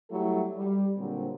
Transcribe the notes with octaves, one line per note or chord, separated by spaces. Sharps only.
F#3 G3 A3 E4 G4 A4
G3
A#2 D3 F#3 G3 C4